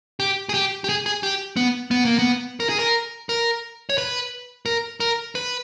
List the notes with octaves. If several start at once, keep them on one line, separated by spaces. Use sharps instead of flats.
G4
G#4
G4
G4
G#4
G#4
G4
B3
B3
A#3
B3
A#4
G#4
A#4
A#4
C#5
B4
A#4
A#4
B4